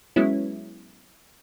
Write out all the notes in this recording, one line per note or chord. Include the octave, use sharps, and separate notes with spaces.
F#3 G#3 B3 C#4 E4